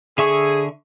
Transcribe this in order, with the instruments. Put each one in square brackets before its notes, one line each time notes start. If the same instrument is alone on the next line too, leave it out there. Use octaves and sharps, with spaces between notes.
[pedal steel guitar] D3 E5 C#6 [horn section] G#4